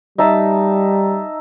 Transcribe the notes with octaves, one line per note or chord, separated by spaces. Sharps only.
G3 D#4 E5 A5